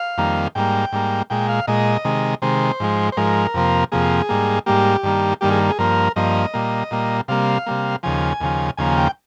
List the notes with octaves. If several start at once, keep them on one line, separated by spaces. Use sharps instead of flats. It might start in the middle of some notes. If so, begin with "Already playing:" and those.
Already playing: F5
F2 D#3 G3 A#3
G#2 G3 A#3 G5
G#2 G3 A#3
A#2 G#3 G5
F5
A#2 G#3 D#5
C3 D#3 G#3
C3 D#3 G#3 C5
G#2 F3 G#3
C5
G#2 F3 G#3 A#4
F2 C3 F3 A#3
F2 C3 F3 A#3 G#4
G#2 G3 A#3
G#2 G3 A#3 G4
G2 D#3 G3 A#3
G2 D#3 G3 A#3 G4
G#4
G#4
G2 F3 A#3 A#4
G2 F3 A#3 D#5
A#2 G3 A#3
A#2 G3 A#3
C3 G3 A#3 F5
C3 G3 A#3
D#2 C#3 F3 G#5
D#2 C#3 F3
D#2 C#3 F3 A#3 G#5
G5